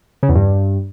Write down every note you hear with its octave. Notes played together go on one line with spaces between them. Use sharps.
C#3
E2
G2